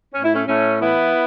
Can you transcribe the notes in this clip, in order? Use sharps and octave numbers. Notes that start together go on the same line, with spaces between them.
A2 C#4
E4
A3 C#4
A2 A3 C#4
E3 B3 E4